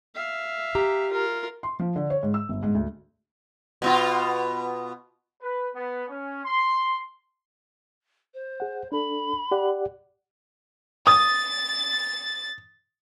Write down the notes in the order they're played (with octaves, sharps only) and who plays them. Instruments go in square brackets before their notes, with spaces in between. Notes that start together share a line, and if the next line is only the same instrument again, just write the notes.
[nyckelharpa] E5 F5
[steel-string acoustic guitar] G4 A#5
[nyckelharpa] F4 A#4
[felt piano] C6
F3
D3
C#5
G#2
E6
G1
G#2
D2
[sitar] B2 B3 F4
[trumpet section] B4
B3
C#4
C6
[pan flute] C5
[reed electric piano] G#4 F#5
[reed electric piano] D4 A4 [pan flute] B5
[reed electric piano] G4 D5 F#5
[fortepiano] D#6 [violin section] A6